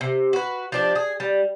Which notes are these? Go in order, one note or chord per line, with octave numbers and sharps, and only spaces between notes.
C3
F#4 B4
F3 D4 G4
G#4
G3